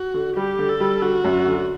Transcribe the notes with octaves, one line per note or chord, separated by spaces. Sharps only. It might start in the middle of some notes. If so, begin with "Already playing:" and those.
Already playing: F#4
D3
G3 G4
D3
A4
G3
D3 F#4
F#2
D3